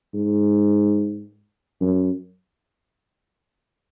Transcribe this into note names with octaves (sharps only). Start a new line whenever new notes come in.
G#2
F#2